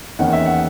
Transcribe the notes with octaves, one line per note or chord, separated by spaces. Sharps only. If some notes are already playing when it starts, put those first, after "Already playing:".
E2 D#3 A#3 C#4 F#5
E5
F#5